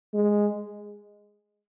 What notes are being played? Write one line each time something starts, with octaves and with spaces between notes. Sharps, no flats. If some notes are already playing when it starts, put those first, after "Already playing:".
G#3